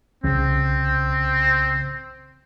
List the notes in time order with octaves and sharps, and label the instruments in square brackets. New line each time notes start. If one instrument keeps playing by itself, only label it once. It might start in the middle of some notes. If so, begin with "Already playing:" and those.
[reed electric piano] C2 C#3 [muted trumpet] C4